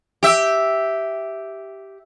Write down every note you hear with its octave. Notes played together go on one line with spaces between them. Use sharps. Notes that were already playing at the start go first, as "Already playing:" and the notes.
G4 E5